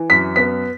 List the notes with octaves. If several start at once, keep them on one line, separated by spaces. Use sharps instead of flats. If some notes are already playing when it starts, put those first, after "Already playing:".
Already playing: E3
F#2 B6
B3 B6